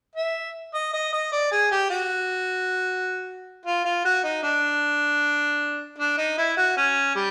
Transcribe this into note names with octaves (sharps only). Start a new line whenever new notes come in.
E5
D#5
D#5
D#5
D5
G#4
G4
F#4
F4
F4
F#4
D#4
D4
D4
D#4
E4
F#4
C#4
G3